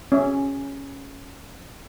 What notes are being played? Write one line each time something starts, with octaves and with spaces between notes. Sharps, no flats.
C#4 E5